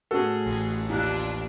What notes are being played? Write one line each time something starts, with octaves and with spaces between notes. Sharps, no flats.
A2 C#4 F#4 G#4 A4
A1
D#2 D4 F4 F#6